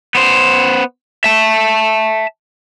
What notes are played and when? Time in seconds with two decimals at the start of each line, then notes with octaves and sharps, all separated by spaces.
0.15 B3 C5
1.24 E5 A5